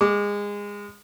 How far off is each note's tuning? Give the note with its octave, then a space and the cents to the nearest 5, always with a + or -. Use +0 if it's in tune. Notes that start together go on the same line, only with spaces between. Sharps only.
G#3 -25 D6 +0